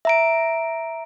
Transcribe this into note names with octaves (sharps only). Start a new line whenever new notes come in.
E5 A#5 D7